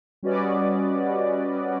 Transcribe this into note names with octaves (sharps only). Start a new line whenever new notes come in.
G3 C#4 F#4 B4 D5 D#5